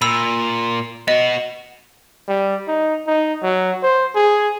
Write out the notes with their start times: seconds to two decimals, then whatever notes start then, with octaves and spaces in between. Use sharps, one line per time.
0.02 A#2 B5 E6
1.08 B3 F#4 D#5
2.28 G3
2.67 D#4
3.07 D#4
3.43 F#3
3.83 C5
4.15 G#4